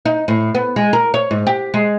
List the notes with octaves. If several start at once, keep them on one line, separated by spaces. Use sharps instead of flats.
D#4
A2
B3
G#3
A#4
C#5
G#2
G4
G#3